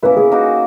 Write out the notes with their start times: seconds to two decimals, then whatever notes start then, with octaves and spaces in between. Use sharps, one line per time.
0.03 A#3 C#4 E4 B4
0.17 G#4
0.32 A#3 D#4 F#4